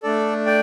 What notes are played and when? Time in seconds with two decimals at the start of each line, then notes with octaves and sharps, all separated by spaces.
0.03 A3 D4 A4 D5
0.46 D5 G5